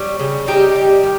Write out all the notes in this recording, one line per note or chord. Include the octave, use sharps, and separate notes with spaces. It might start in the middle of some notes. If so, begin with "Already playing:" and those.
Already playing: G3 C#5
C#3
G3 D#4 G4
G3
D#3